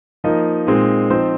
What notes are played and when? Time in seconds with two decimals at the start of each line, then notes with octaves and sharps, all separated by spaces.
0.24 F3 A#3 D#4 D#5
0.67 A#2 G#3 C4 D#4
1.10 F3 C4 D#4 C5